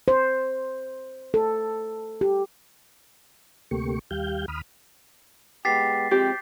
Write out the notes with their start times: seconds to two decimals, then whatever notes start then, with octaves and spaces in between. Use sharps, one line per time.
0.08 C5
1.34 A4
2.21 G4
3.71 D2 C3 A3 A#3 G4 C#6
4.11 D#2 G3 G4 F5 G6
4.48 D#2 B5 D#6 F6
5.65 G#3 B3 G4 A6 B6 C7
6.11 F3 G#3 C4 G4